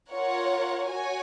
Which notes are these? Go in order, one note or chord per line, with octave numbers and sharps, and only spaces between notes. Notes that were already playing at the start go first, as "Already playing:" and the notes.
F4 A#4 C#5 F#5
F#4 C#5 G#5